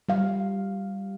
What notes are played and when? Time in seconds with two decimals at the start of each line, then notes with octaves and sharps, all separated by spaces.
0.09 G3 F5